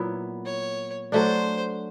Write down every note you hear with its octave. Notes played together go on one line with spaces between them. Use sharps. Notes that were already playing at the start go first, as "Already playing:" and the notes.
Already playing: A#2 F#3 B3 E4
C#5
F#3 A3 D4 C5